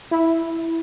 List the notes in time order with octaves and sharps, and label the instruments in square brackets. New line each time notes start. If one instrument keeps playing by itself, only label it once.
[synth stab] E4